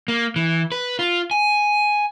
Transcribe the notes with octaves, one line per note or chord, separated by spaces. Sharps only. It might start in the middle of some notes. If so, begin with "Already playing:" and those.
A#3
E3
B4
F4
G#5